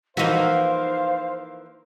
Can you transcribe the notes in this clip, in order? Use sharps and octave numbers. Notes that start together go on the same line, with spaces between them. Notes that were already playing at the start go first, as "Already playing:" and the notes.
E3 F3 A#3 D#4 F#4 C5 F5